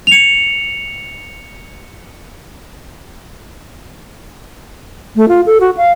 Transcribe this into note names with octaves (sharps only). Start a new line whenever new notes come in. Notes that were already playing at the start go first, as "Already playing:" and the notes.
C#7 F7
A3
F4
A4
F#4
F5